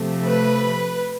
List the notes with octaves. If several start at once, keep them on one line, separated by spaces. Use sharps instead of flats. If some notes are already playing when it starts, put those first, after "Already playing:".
Already playing: C3 F3 A3
B4